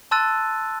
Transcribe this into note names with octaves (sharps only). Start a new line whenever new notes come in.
A5 C6 E6 F#6 A6 D#7